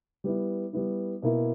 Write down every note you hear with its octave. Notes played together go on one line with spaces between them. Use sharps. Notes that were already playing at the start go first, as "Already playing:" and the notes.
G3 B3 E4
G3 B3 E4
B2 A#3 E4 A#4